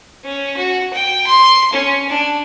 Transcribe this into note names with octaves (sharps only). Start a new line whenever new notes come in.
C#4
F#4
G5
C6
C#4
D4